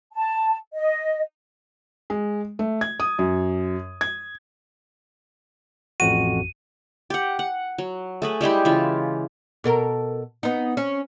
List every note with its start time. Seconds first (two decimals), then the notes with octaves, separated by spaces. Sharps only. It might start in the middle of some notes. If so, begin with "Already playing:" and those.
0.13 A5
0.73 D#5
2.10 G#3
2.59 A3
2.81 G#6
3.00 D#6
3.19 F#2
4.01 G#6
6.00 A1 F2 F#4 D#7
7.10 G4 F#5
7.39 F#5
7.78 F#3
8.22 A3 G#4 B4
8.41 G3 G#3 E4 G4
8.65 C#3 E3 F4
9.64 B2 A4 A#4
10.43 B3 D#4
10.77 C#4